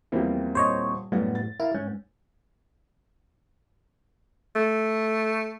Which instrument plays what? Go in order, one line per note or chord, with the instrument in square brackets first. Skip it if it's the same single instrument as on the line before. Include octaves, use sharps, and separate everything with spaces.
[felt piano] E2 F3 G3 [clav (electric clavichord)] A#3 C4 E4
[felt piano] D#1 [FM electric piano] C5 C#5 D#5
[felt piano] F#2 F#5 [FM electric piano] A2 [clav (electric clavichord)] G3 B3
[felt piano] A6
[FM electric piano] E4 [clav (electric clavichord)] A#4 F5
[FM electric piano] G#2 [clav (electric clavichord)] C#4
[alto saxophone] A3